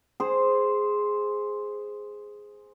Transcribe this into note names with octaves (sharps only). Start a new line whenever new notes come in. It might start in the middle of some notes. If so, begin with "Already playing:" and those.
G#4 C5